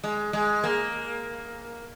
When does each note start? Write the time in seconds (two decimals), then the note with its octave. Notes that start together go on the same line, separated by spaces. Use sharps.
0.04 G#3
0.33 G#3
0.64 A#3